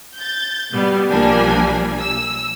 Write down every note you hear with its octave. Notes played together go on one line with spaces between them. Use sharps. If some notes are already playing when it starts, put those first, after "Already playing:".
G6 A6
B2 G3 B3
B1 F3 G3 A#3 D4 G#5
E6